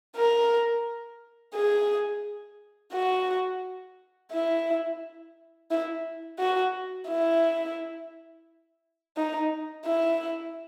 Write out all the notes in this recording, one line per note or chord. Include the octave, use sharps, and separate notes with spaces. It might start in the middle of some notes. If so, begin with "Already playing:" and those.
A#4
G#4
F#4
E4
E4
F#4
E4
D#4
E4